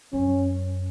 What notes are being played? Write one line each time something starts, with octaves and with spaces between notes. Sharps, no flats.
F#2 C#4